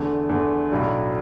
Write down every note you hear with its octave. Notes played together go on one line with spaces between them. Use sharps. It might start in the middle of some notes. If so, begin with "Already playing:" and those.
Already playing: E2 D3 A3
E2 D3 A3
B1 A2 F#3 D4